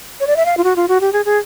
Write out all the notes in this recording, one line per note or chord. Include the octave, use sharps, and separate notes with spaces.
C#5
D5
E5
F5
F4
F#4
F4
F#4
G4
G#4
G#4